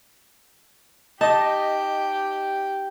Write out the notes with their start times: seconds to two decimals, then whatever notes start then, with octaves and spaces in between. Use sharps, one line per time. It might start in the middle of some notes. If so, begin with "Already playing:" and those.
1.21 D#4 G4 D#5 A5